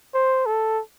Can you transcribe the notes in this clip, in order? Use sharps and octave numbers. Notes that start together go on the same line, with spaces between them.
C5
A4